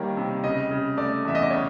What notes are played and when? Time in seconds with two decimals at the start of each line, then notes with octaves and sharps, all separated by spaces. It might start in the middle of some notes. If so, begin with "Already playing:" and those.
Already playing: D#3 G3 A#3 C#5
0.17 C3
0.44 C#3 D#5
0.71 C#3
0.97 A3 D5
1.25 E2 E5
1.35 D#5
1.43 D5
1.50 C#3 C#5